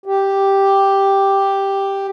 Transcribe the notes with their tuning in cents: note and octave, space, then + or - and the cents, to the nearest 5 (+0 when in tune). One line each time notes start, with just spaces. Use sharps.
G4 +0